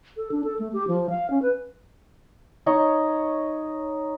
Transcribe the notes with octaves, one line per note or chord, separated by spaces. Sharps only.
A4
D4
A4
A3
G4
F3
F5
C#4
B4
D#4 C#5 D#5 C#6